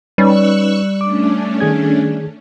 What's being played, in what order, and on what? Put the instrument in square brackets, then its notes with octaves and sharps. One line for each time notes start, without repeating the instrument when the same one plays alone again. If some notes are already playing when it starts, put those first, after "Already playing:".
[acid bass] G3 [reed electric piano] C#4 D#4 B4 [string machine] C#6 E6 F#6
[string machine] A3 C#4 D4 [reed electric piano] D6
[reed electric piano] D#3 G#4 G#6